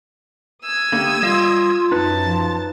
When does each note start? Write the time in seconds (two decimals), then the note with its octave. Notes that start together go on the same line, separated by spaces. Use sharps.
0.64 D#6 E6 G#6
0.92 D3 A3 A#3 G4
1.22 G3 F4 D#5 F5
1.92 F#2 D#4 B4 A5 A6
2.25 F3